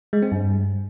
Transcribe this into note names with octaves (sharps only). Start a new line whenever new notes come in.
G#3
C4
G2